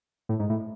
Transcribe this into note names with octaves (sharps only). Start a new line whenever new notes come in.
A2
G#2
A2